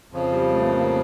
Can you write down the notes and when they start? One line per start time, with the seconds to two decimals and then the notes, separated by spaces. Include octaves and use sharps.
0.12 F2 C#3 F3
0.33 G3
0.54 A3
0.61 B3
0.67 A#3
0.80 A#3